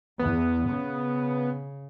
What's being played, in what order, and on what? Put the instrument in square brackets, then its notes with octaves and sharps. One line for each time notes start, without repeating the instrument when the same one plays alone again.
[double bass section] E2 [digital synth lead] B3
[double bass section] C#3